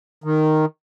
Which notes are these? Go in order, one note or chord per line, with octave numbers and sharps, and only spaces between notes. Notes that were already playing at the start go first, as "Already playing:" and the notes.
D#3